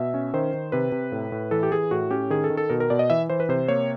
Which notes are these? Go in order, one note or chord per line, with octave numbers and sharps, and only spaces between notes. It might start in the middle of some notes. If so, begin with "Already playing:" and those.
Already playing: B2 E5
C#4
D#3 C5
D#3
C3 B4
C3
A2
A2
E3 A4
G4
E3 G#4
A2 F#4
C#4 G4
D#3 G#4
A4
D#3
A4
B2 A#4
A#4
B2 D5
D#5
E3 E5
E3 C5
B4
C3 C5
A#3 C#5